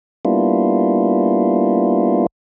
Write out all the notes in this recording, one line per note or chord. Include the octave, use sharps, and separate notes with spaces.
G3 A#3 B3 D4 E4 F4